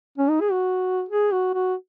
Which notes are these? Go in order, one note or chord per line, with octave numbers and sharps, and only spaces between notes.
C#4
D#4
G#4
F#4
G#4
F#4
F#4